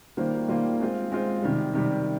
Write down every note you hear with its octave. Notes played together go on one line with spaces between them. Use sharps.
D#3 G3 A#3 F4 C5
D#3 G3 A#3 F4 C5
G#3 C4 F4 C5
G#3 C4 F4 C5
C3 D#3 G3
C3 D#3 G3